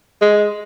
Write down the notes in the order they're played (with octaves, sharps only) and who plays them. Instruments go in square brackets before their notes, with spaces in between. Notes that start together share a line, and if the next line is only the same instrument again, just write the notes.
[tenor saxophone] G#3